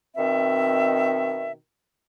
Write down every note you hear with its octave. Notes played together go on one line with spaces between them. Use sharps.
B2 D#3 C4 E5